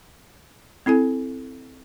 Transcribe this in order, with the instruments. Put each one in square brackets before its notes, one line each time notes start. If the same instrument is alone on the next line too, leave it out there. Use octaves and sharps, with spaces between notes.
[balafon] C4 E4 A4 G#5